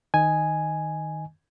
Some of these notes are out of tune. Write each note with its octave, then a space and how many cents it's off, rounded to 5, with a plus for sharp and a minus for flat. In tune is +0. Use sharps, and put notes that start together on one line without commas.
D#3 +0 D#5 +0 G#5 +0